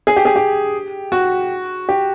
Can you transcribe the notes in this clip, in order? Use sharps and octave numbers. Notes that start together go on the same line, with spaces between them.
G#4
G4
G#4
G4
F#4
G4